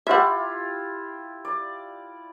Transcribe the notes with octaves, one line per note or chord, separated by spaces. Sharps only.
E4 F4 G4 E5 F#5
D5